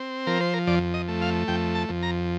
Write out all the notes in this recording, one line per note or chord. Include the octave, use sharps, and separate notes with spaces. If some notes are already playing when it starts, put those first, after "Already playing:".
Already playing: C4
F3 A#4
C5
A#4
F2 D5
D#5
A3
F5
F2 G5
A5
F2
A#5